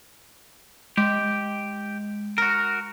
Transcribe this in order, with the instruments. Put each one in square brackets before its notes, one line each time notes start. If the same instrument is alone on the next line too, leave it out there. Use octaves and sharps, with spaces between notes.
[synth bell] G#3 [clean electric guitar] G4
[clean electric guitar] F#4 A#4